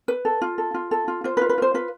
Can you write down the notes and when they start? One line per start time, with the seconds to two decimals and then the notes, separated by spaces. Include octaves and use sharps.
0.08 B4
0.25 A4
0.42 F4
0.58 A4
0.74 F4
0.91 A4
1.08 F4
1.24 F4 C5
1.37 B4
1.41 F4
1.49 B4
1.58 F4 C5
1.74 F4 B4